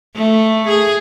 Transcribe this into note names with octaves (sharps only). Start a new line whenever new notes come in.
A3
G#4